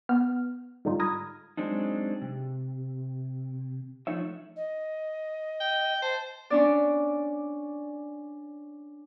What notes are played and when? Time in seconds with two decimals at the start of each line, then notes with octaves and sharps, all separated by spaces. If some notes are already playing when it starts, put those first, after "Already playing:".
0.09 B3 F6
0.85 G#2 D3 G3 D#4 F4
1.00 A#5 B5 D#6 F6 G#6 A#6
1.57 F#3 G#3 C4 D4 D#4
2.21 C3
4.07 F3 A3 D4 D#4 C#5 E5
4.57 D#5
5.60 G5
6.02 C5 A5
6.50 C#4 D4 D5